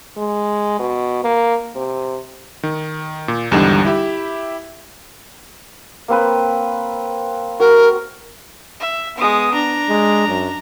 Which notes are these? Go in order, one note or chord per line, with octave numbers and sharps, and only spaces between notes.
G#3
B2
A#3
C3
D#3
A#2
G#1 E2 D3 G3 D#4 E7
E4 G4 E5
A#3 C4 B4
F#4 A#4
E5
G#3 B3 D#6
D4 A#5
G#3
F#2